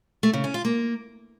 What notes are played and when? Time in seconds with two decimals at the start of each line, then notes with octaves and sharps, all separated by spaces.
0.23 A3
0.33 C#3
0.44 C#4
0.54 F4
0.65 A#3